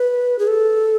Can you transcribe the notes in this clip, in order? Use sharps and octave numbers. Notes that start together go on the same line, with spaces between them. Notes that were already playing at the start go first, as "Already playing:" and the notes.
Already playing: B4
G#4
A4